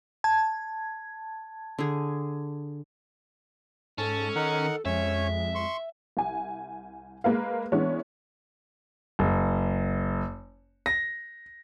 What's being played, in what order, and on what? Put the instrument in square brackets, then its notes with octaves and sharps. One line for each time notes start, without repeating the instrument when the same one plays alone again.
[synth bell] A5 G#6
[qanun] D3 G#4
[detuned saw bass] G#2 [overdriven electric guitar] C#4 [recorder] A4 [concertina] A5
[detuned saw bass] D#3 [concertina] D#4 A#4 F#5
[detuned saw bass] F2 [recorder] G#3 [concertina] C#4 C#5 [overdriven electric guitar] E5
[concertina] C6 C#6
[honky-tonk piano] C2 G#5
G#3 A#3 B4 F5
E3 G#3 B3 C#4 D4
[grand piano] F#1
A#6